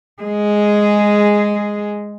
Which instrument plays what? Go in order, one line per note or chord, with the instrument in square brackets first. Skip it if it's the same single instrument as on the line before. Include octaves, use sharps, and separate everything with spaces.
[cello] G#3 G#4